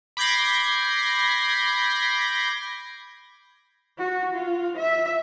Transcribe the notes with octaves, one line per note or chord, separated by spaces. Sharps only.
B5 D6 G6 G#6 A#6 C7
F#4
F4
E5